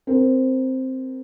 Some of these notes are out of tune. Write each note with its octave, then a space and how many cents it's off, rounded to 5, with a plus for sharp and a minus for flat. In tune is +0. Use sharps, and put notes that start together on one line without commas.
C4 +0 A#4 +0